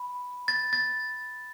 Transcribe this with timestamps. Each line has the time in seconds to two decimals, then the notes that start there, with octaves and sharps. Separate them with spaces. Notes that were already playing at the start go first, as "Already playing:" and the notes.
Already playing: B5
0.48 A6
0.73 A6